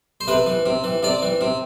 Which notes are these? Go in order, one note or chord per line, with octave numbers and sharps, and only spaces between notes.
C5
C3 B4
E3
C3
E3
C3 D5
E3
C3